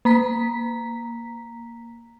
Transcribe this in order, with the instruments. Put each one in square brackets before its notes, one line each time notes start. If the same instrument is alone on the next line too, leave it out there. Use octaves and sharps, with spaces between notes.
[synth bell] A#3 A#5 B6